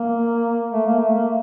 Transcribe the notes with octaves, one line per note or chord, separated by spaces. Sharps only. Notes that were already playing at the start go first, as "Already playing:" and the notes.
Already playing: A#3
A3
A#3
A3
A#3